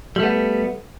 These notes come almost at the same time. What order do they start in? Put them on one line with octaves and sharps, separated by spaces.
G3 A3 B3